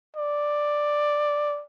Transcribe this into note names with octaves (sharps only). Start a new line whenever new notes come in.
D5